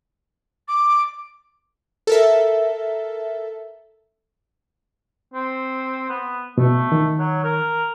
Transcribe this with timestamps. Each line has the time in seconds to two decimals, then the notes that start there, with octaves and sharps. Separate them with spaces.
0.68 D6
2.07 A4 A#4 E5
5.34 C4
6.09 B3
6.58 B2 A3
6.92 D#3
7.19 F#3
7.44 A#4